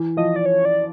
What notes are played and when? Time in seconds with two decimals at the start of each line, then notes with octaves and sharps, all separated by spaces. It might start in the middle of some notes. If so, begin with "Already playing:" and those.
Already playing: E3
0.17 F3 D#5
0.36 D5
0.46 C#5
0.65 D5